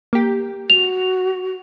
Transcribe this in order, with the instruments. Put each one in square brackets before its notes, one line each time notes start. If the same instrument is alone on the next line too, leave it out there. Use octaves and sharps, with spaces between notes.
[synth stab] A#3 G4
[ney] F#4 [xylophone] F7